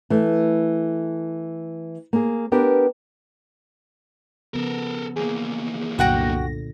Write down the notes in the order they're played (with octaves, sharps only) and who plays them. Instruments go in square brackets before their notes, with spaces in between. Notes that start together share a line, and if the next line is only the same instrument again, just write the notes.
[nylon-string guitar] E3 A3
A#3 G#4
B3 D4 G4 A#4 B4
[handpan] C#3 F3 B3 [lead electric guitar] A4 A#4
[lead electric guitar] E2 A#3 [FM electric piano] G#4
[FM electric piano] C2 F#2 A#6 [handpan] A#2 D3 [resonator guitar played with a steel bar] F#4 F#5 G5